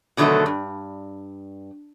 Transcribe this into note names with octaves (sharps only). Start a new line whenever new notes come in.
B2 D3 D#3 F#3 A3 A4
G2